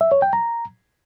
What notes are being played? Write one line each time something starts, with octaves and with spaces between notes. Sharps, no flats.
E5
C#5
G5
A#5